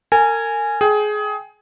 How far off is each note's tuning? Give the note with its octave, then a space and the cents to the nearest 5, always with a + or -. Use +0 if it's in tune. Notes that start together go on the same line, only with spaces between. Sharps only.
A#4 -35 G#5 +0
G#4 +20 G5 +5